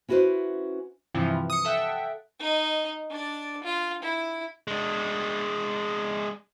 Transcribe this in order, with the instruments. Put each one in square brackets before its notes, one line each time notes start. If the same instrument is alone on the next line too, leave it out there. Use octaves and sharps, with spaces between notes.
[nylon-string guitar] C#4 E4 F#4 A4 B4 C5
[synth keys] G2 C3 E3 F3
D#6 C#7
A4 E5 F#5 G5
[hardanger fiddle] D#4 D#5
D4 D5
F4
E4
[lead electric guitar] G#3 D4